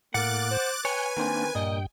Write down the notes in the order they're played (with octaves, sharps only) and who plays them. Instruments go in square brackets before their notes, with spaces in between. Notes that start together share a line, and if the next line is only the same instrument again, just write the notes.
[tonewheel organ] A2 [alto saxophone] A#3 [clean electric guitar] F#5 [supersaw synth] D6 F#6 A6
[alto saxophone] C5
[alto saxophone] B4 [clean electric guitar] C#5 [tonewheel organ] G5 F#6 [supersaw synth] G#5
[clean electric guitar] D#3 C4 [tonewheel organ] A#3 D4
[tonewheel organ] G2 G5 [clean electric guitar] A#2 [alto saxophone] D#5